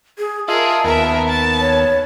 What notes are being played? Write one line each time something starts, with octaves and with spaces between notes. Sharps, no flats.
G#4
F4 G#4 A#4 D#5 E5 A5
D#2 B3 A#4 E5
A5
C#5